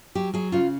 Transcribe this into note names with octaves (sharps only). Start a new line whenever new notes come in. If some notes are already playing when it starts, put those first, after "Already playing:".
F#3 G4
F#3 G#4
C#3 F4